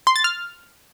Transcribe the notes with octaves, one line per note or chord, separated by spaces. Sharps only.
C6
A6
F6